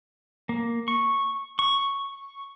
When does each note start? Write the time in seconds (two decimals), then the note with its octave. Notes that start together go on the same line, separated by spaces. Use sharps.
0.49 A#3
0.88 C#6
1.59 C#6